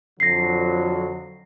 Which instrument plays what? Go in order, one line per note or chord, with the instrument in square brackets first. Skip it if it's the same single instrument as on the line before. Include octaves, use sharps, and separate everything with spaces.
[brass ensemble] F2 D3 F#3 [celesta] A#6 C7